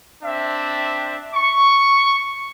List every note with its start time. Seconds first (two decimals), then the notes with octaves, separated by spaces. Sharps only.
0.23 C4 D4 E5
1.34 C#6